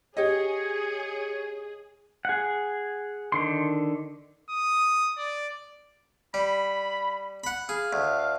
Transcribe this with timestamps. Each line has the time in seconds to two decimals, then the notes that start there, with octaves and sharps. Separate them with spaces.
0.17 G4 G#4 C#5 D#5
2.25 G#4 F#5
3.32 D3 D#3 C6
4.50 D#6
5.18 D5
6.34 G3 B5
7.44 F#5 B5
7.69 G#4 F5
7.93 D2